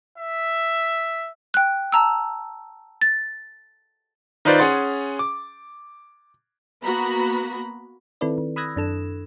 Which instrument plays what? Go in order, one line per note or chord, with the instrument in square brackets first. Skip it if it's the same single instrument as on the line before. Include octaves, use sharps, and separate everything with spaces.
[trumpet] E5
[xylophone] G5 F#6
A5 A#5 E6
A6
[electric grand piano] D#3 D#4 F4 B4 C5 D5
C#4 G#4 F#5 C6 A6
D6
[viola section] A#3 B3 F#4 A#5 B5
[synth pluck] D#3 C4 E4 A4 B4 D5
D#3
B5 D#6 E6 F#6 G#6 A#6
F#2 D4 A4 E7